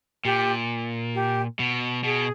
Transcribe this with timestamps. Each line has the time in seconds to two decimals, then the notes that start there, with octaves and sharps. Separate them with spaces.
0.25 A#2 G4
1.15 G4
1.59 B2
2.04 B2 G#4